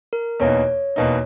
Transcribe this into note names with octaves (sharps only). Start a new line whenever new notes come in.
A#4
E2 B2 A#3 D#4 C#5
E2 B2 A#3 D#4